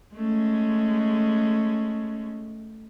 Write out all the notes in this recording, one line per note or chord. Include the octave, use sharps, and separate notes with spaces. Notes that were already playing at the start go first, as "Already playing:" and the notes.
G#3 A3 C#4